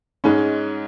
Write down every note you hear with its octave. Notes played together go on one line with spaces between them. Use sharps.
G#2 G#3 C#4